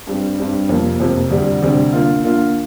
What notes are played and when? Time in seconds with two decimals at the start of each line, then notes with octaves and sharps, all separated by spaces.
0.07 G2 G3 C4
0.38 G2 G3 C4
0.69 F2 C3 F3 A#3
1.00 F2 C3 F3 A#3
1.31 D2 C3 G3 D4
1.62 D2 C3 G3 D4
1.93 D3 A#3 F4
2.24 D3 A#3 F4